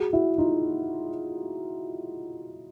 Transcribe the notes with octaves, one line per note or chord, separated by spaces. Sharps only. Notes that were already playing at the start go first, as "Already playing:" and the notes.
Already playing: F#4 G#4
E4 F#4
D#4 F4